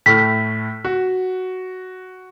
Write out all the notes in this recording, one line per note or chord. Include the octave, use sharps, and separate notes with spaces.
A2 A3 F6 B6
F#4